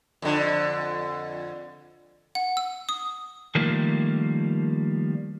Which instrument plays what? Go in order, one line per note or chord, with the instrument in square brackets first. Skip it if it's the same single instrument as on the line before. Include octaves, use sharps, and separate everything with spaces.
[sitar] F2 D3
[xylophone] F#5
E6
D#6
[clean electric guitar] D#3 F3 G3 A3 A#3